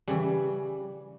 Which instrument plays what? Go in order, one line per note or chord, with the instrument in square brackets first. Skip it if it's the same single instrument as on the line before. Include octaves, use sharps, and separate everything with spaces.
[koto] C#3 E3 [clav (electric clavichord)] G3